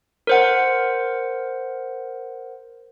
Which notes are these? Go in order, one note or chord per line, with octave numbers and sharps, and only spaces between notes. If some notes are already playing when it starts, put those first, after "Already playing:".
A#4 C5 F#5